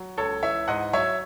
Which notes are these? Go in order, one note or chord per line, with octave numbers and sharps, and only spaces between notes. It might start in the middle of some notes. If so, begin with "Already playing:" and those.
Already playing: F#3
C#2 A4 C#5
E3 C#5 E5
G#2 D#5 F#5
F#3 C#5 E5